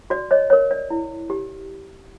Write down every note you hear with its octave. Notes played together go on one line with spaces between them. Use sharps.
F#4 D5
C#5 D#5
A#4 C#5
D5
E4
G4